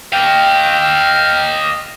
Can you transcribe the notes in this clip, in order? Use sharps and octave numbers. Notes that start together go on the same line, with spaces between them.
D#5 F5 G5